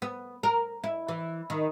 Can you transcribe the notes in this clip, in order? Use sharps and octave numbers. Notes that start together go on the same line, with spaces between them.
B3
A#4
E4
E3
D#3